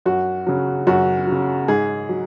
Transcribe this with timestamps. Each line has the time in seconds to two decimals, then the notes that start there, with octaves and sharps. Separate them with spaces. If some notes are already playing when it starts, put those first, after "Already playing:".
0.06 F#2 F#4
0.46 C#3 F#3
0.87 F#2 F#4
1.27 F#3
1.32 C#3
1.68 G#2 G#4
2.09 F#3